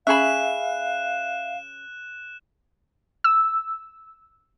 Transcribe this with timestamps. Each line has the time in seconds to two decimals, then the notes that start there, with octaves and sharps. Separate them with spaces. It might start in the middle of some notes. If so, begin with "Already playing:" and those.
0.07 C#4 G#4 E5 F5 B5 F#6 E7
3.24 E6